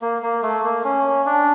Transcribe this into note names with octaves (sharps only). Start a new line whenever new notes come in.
A#3
A#3
A3
A#3
C#4
D4